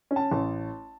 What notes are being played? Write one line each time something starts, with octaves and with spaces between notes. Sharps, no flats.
C#4
A5
A1